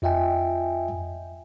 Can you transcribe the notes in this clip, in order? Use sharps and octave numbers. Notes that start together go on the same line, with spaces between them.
F2 F4 D#5 E5 G5 G#5